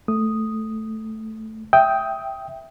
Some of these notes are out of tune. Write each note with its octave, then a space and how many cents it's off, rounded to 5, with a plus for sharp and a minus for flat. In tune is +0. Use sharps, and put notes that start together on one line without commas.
A3 +0 D#6 +0
E5 +0 G5 +0 D#6 +20